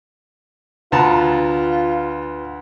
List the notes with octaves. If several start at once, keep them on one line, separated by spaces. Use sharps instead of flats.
D2 F4 B4 F#5 A5 A#5